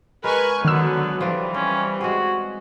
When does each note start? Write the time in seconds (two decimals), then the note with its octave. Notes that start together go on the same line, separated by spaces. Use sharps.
0.24 G#3 A#4 B4 G#5 C#6
0.65 D3 D#3 F#3 B3 E6
1.21 E3 F3 G3 D4
1.54 C4 C#4
2.01 G#3 F#4 G#4